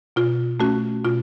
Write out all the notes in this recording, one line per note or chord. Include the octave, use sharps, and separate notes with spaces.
B2 F4
A3 C#4 F#4
B2 F4